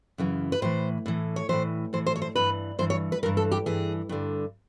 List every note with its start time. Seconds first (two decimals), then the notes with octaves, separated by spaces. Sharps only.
0.18 F#2 C#3 E3
0.52 B4
0.62 A2 E3 C5
1.06 A2 E3
1.36 C#5
1.49 A2 E3 C5
1.93 A2 E3 C5
2.07 C5
2.16 C#5
2.22 C5
2.35 G2 E3 B4
2.79 G2 E3 C5
2.90 C#5
3.12 B4
3.23 E3 A#4
3.26 G2
3.37 A4
3.52 G4
3.66 G2 E3 G#4
4.09 G2 D3